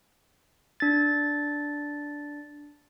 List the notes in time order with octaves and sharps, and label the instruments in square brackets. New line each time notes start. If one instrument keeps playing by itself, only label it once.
[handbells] D4 A6